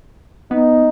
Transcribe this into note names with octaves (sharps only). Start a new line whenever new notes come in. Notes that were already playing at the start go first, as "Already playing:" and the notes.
B3 D#4